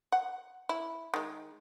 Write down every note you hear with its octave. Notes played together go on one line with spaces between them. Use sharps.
F#5
E4
D#3 G#3